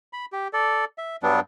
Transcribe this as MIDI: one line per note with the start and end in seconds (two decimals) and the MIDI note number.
0.13 0.26 83
0.33 0.48 67
0.53 0.85 69
0.53 0.85 74
0.98 1.16 76
1.23 1.40 43
1.23 1.40 54
1.23 1.40 55
1.23 1.40 59
1.23 1.40 62